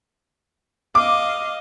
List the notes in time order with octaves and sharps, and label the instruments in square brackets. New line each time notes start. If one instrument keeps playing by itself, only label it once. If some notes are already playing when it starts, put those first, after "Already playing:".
[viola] D#5 F5 [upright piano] D6